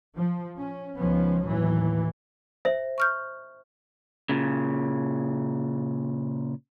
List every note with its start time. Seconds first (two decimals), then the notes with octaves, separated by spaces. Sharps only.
0.16 F3
0.57 C#4
0.97 C#2 D#3 F3 B3 C#4
1.45 D#2 A2 E3 F#3
2.65 C5 E5
2.98 C#6 F6 G6
4.29 A#2 C#3